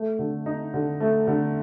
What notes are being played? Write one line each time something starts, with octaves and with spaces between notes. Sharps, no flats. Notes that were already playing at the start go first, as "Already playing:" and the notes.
Already playing: A3
D3
D#4
D3
A3
D3